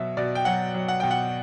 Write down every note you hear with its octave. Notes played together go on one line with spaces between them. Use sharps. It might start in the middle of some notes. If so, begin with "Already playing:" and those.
Already playing: B2 F#3 E5
B2 D5
G5
F#3 F#5
F#3
F#5
B2 G5
F#5